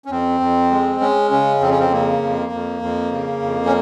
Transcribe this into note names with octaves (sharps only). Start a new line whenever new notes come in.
C#4
F2 C4
F2
G#3
G#3 C#4
C#3 C#4
F2 C4
C#4
C4
C#3 A#3
F2
F2
F2
C#3
F2
C#4